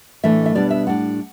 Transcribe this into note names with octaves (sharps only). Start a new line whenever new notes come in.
A2 E3 A3 D4 E5
E5
B2 G3 B3 D4 D5
E5
A2 G3 D4 F#5